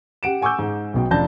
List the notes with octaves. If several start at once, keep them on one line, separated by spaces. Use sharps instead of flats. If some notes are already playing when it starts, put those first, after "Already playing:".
G4 F#5 D7 E7
F#5 G#5 C#6 D6 E6 G6
G#2
B1 B2 G5
F1 D4 F4 A5 G6 A#6